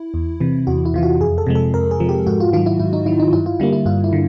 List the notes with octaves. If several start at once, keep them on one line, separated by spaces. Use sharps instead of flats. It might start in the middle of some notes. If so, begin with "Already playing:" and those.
Already playing: E4
E2
C3 E3
E2 F#4
E4
C3 E3 F4
F#4
F2 G#4
A4
C3 F3 G#3
A4
F2 A#4
G#4
C3 F3 G#3
G4
G#2 F#4
F4
D#3 F#3 F4
E4
G#2 E4
D#4
D#3 F#3 E4
D#4
G2 E4
F4
D3 G3 A#3 E4
E4
G2 F4
E4
D3